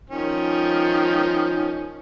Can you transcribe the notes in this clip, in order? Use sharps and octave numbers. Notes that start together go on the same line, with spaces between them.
D#3 F3 C#4